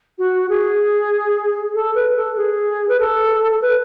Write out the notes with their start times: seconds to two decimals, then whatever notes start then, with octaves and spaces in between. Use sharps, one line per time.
0.18 F#4
0.50 G#4
1.75 A4
1.95 B4
2.17 A4
2.37 G#4
2.89 B4
3.00 A4
3.62 B4